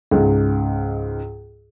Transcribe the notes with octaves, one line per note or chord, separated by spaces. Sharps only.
C#2 G#2